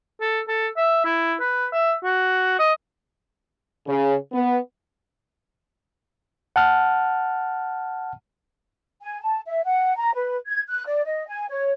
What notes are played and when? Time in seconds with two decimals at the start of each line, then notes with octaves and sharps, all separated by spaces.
0.21 A4
0.48 A4
0.77 E5
1.05 E4
1.40 B4
1.73 E5
2.04 F#4
2.59 D#5
3.87 C#3
4.32 B3
6.56 F#5 A5 F6
9.02 G#5
9.22 A5
9.47 E5
9.64 F#5
9.97 A#5
10.14 B4
10.48 G#6
10.68 F#6
10.87 D5
11.05 D#5
11.28 G#5
11.49 C#5